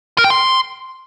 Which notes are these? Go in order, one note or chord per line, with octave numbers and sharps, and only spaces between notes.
A#4
G5
C6